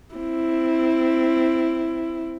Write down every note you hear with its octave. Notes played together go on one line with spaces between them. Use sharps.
C4 E4